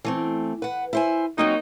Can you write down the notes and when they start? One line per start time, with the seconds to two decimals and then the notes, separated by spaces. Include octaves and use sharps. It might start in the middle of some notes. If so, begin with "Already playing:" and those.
0.04 E3 A3 C4
0.62 B4 F#5
0.93 E4 C5 G#5
1.38 F#3 A#3 C4 D#4 F#4